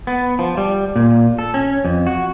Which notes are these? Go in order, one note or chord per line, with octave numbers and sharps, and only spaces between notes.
B3
F3
G3
A#2
A4
C#4
F2
F#4